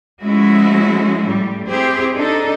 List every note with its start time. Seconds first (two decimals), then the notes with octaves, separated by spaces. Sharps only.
0.22 F3 G#3 A3 C#4 E4 F#4
1.25 A2 G3
1.68 C4 E4 G4 G#4 C5
2.15 D4 D#4 A4